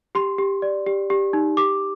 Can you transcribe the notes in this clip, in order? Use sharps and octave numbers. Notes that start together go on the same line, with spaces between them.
G4 C6
G4
D5
G4
G4
D#4
G4 D6